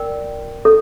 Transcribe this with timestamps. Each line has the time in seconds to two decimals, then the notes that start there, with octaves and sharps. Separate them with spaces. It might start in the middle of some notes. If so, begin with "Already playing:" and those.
Already playing: A#4 D5 G5
0.65 A4